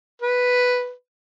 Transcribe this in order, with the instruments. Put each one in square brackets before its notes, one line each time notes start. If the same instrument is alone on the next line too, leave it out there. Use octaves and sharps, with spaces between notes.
[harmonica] B4